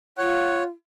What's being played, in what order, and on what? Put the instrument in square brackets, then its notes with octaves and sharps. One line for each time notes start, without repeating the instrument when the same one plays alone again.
[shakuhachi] F4 [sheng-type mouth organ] C#5 [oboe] F#5